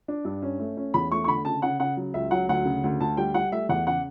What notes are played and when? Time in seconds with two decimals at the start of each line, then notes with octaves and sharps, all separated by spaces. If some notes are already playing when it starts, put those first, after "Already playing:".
0.08 D4
0.25 G2
0.42 C#4
0.59 A3
0.77 C#4
0.94 E2 B5
1.11 A3 C#6
1.24 C#6
1.28 D3 B5
1.45 C#3 A5
1.62 C#3 F#5
1.80 C#3 F#5
1.97 F#3
2.14 C#2 E5
2.31 F#3 F#5
2.49 D2 F#5
2.65 C#3
2.84 D2
3.01 D2 A5
3.17 G3 G5
3.34 G3 F#5
3.52 A3 E5
3.69 E2 F#5
3.87 C#3 F#5